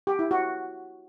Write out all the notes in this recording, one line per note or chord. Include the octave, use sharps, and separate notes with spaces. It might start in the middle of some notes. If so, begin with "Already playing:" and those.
G4
E4
F#4